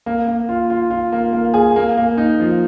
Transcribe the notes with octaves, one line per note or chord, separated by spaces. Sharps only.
A#3
A#3
F4
F4
F4
A#3
A#3
G#4
A#3
A#3
D#4
F3